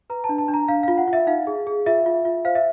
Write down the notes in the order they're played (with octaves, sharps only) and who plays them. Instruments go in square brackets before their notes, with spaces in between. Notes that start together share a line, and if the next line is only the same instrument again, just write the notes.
[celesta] B4 A#5
A5
D4
A5
D4
A#5
D4 F5
F4 F5
F#5
F4
E5
D#4 F5
G#4
G#4
F4 E5
F4
F4
C5 F5
E5